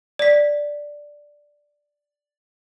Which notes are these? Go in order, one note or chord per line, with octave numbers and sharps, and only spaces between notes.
D5 B6